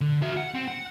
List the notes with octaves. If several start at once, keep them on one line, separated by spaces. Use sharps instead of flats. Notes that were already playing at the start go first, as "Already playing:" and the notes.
D3
F#4 E5
F#5
C4
F#5